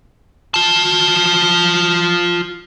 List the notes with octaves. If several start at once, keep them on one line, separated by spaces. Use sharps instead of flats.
F4 A5